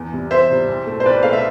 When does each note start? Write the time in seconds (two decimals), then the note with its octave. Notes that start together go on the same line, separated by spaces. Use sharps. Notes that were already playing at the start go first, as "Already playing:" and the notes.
Already playing: E2
0.12 C3 G3
0.31 E2 C5 E5
0.50 C3 G3
0.68 C2
0.87 B2 A3
1.00 C5
1.05 C2 B4 D5
1.23 B2 A3 F5
1.33 E5